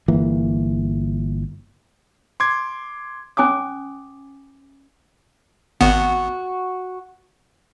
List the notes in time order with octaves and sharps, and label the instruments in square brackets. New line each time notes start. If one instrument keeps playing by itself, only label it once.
[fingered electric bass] G1 E3 A#3
[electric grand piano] C6 D6 G#6
[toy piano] C#4 G#5 D6 D#6
[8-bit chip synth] G#1 B3 [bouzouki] F#4